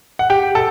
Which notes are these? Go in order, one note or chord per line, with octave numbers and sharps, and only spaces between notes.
F#5
G4 G5
A4 A5